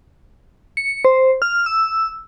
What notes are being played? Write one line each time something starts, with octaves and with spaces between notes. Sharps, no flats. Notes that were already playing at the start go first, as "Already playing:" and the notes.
C#7
C5
F6
E6